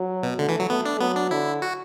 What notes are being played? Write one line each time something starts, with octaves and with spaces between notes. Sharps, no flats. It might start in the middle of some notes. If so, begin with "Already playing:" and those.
Already playing: F#3
B2
D3 A3
E3
F#3
A3 B3
D4
F#3 B3
D4
D3 E4
F#4